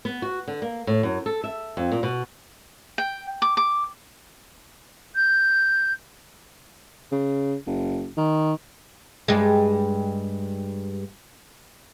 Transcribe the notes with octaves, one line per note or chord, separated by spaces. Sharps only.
B3
F#4
D3
A#3
A2
F#2
A4
E5
F2
A#2
B2
G5
D6
D6
G6
C#3
F#1
D#3
G2 G#3